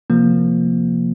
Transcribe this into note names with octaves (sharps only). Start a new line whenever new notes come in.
C3 F3 A#3